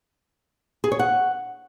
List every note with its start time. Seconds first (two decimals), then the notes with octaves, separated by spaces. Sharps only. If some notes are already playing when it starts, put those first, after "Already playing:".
0.84 G#4
0.92 C#5
0.99 F#5